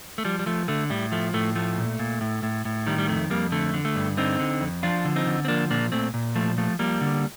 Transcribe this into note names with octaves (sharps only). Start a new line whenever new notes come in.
A3
F3 G3
G3
F3 A3
D3 A3
A2 G3
F3 A3
A2 A3
F3 A3
A#2
A#2
A2
A2
A2
D#3 G3
G3
F2 A3
F2 G3 A#3
D3 A3
D3
A3
G2
D3 C4 D#4
D3
F2
F3 D4 F4
D3
C4 D#4
D3
C4
F3 A#3 D4
A#2 A#3 D4
A#2 A3 C4
A#2
F3 A3
F3 A3
F3 G3 A#3
D3